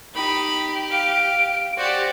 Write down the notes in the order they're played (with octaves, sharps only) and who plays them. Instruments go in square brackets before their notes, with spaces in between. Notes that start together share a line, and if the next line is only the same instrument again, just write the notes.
[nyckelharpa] D#4 B5 [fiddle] G4
[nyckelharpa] F5 [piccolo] D7
[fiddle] F#4 G4 [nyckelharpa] C5 D5